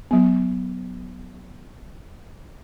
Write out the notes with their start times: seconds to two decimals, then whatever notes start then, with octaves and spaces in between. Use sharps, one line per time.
0.11 F#3 B3